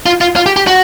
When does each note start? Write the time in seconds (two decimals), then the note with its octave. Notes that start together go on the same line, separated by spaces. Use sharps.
0.06 F4
0.21 F4
0.36 F4
0.46 G4
0.56 G4
0.67 F#4